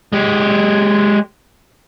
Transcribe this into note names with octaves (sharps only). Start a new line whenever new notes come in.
G#3 G4